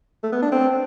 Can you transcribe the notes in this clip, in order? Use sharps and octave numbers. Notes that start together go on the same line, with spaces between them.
A3
B3
D4
C4